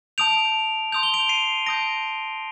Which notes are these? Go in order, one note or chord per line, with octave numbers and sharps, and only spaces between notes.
A5 D#6 G6 D7 F7
C6 D#6 G6 F7
G7
D7 F7
C7 D#7
A5 D#6 G6 A#6 D7